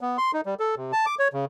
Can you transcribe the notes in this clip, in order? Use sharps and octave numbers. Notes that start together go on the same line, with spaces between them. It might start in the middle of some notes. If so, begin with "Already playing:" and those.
B3
C6
D#4
G3
A4
C3
A5
D6
C#5
C#3